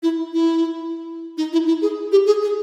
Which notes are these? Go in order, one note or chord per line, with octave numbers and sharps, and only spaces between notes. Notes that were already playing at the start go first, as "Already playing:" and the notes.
E4
E4
D#4
E4
E4
G#4
G4
G#4
G#4